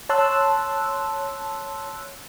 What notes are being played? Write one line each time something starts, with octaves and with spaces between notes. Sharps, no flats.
C#5 A5 C6 E6 F#6